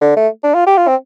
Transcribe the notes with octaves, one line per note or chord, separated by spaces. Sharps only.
D3
A3
D4
F4
G4
F4
C4